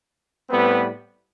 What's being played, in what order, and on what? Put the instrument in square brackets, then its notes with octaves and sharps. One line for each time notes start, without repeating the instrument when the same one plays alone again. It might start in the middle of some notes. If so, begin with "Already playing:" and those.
[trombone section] A2 G3 B3 C4 B4